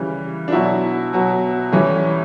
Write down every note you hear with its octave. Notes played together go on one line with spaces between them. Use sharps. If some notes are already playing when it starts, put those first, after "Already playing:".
Already playing: C#3 E3 G3
D4
B2 F#3 E4
B2 F#3
A2 E3 G3 C#4